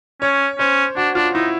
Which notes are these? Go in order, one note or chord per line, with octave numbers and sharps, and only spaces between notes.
C#4 C#5
C#4 C5
D4 F#4
D4 F4
D#4 E4